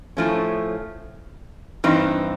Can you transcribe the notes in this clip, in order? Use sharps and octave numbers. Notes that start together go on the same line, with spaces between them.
A2 F3 A3 C#4
G2 E3 C4 D#4